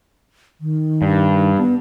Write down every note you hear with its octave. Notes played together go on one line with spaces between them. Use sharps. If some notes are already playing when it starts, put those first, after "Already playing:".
D#3
G2
B3